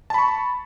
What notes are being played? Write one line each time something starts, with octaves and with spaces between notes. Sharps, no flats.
A5 B5 C#6